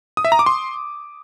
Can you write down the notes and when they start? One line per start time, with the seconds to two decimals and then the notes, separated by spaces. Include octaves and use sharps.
0.17 D#6
0.25 E5
0.32 A#5
0.39 D6
0.46 C6